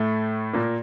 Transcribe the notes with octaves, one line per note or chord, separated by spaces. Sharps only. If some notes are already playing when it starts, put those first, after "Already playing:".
Already playing: A2 A3
A#2 A#3